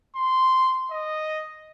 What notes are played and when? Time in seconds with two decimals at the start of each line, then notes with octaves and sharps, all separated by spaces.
0.16 C6
0.91 D#5